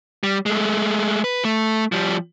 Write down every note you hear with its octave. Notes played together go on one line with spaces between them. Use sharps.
G3
G#3 A3
B4
A3
F3 G3